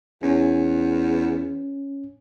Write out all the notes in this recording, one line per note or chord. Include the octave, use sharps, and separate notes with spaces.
E2 C#4